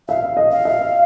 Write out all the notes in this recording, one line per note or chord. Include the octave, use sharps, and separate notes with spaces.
E5 F5
D#5
F5
E5